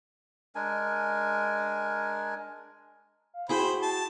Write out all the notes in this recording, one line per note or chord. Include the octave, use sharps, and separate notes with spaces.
G#3 D4 A#4 G#5
F5
E4 F#4 G#4 C5 G5 B5
A5